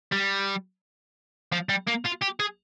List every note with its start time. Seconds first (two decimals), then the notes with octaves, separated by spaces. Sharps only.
0.12 G3
1.52 F3
1.69 G3
1.87 A#3
2.05 F4
2.21 G4
2.40 G#4